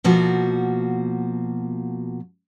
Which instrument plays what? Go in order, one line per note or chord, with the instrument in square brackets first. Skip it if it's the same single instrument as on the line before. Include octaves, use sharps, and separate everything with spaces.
[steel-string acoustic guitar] B2 F3 A#3 F#4